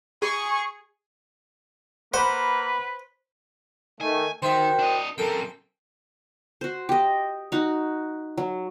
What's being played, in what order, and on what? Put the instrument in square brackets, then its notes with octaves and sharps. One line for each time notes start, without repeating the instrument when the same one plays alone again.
[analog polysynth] G#4 [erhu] C#6
[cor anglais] A#3 [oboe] B4 [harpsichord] C5 [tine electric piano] F#5 B5
[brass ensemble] D#3 A3 [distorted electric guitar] G#5
[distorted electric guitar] D#3 [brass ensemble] F#4 A#4 G5 [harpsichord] C5 E5
[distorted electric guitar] D4 D#5
[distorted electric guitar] F#2 C4 [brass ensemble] A4 A#4 [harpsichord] G5
[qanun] F#4 C5
G4 D#5
D#4 F#4
F#3